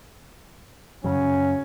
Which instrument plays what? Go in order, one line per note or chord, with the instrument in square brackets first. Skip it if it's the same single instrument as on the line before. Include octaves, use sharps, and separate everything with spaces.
[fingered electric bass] F#2 C#3 F#3 [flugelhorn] C#4